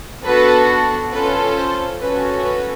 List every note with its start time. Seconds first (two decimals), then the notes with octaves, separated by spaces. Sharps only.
0.24 B3 D4 F#4 A4 B4
1.12 C#4 F4 A4 B4
1.57 C5
2.01 C#4 F#4 A4 B4
2.44 B4